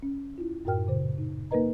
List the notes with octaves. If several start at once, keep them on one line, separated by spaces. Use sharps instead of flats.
C#4
E4 F4
F#2 A2 F#4 A#4 G5 F6
A#2 C#3 C5
D#4
A#3 D#4 A#4 B4 D#5 A#5